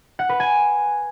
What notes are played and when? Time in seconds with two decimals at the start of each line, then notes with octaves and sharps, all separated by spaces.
0.19 F#5
0.29 B4
0.40 G#5